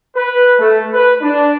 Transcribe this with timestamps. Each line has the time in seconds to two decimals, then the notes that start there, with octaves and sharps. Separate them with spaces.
0.16 B4
0.59 A3
0.93 B4
1.21 D4